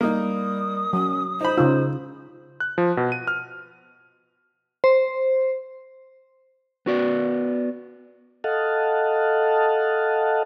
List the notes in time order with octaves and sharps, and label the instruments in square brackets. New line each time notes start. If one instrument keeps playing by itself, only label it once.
[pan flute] G3 [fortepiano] A#3 D#4 [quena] D#6
[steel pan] F#3 [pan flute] C#4
[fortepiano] D#4 B5 [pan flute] C5
[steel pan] C#3 D#4 F4 [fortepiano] E6
[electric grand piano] F#6
F3
B2
D#7
F6
[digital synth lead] C5
[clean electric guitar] B3 F#4 D5
[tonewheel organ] A4 D#5 F5 F#5 A5